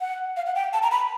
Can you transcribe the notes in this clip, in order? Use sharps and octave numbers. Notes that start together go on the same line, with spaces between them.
F#5
F5
F#5
G5
A5
A#5
B5